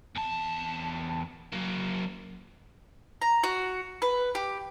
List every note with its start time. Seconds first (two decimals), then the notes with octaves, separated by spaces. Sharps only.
0.15 E2 A5
1.53 F#3 A#3
3.22 A#5
3.44 F#4
4.02 B4
4.35 G4